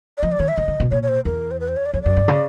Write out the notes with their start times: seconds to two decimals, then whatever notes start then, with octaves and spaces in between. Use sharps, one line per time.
0.18 D5
0.23 F3 D#5
0.32 D5
0.40 D#3 C#5
0.48 E5
0.57 D3 D#5
0.68 D3
0.80 B2
0.91 A#2 C#5
1.03 C#5
1.08 C5
1.25 E2 A#4
1.51 C5
1.60 B4
1.68 C5
1.76 C#5
1.86 D5
1.93 F2 C#5
2.02 F#2 D5
2.17 G2
2.28 C#3